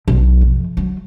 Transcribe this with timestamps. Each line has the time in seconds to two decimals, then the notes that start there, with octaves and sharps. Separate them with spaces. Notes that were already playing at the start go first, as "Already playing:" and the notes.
0.08 B1
0.41 F2
0.77 F#3